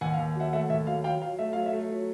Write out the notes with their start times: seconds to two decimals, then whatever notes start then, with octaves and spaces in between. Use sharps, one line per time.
0.01 D#2 F#5 G#5
0.14 F5
0.18 D#2
0.36 F#3 E5 F#5
0.53 A3 E5 F#5
0.70 D#2 E5
0.87 F#3 F5
1.04 F#3 F5 G5
1.22 F#3 F5
1.39 A3 E5
1.53 F#3 F5
1.66 E5
1.73 A3
1.91 F#3